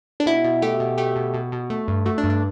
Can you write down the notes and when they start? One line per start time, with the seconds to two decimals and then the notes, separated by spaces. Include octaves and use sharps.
0.20 D4
0.26 B2 E4
0.44 B2
0.62 A3 G4
0.80 B2
0.98 A3 G4
1.16 B2
1.34 B2
1.52 B2
1.70 A3
1.88 G2
2.06 A3 F#4
2.18 D4
2.24 G2
2.30 D4